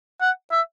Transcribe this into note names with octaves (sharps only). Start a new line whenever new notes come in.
F#5
E5